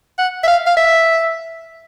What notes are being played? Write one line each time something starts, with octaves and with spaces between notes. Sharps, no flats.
F#5
E5
F5
F5
E5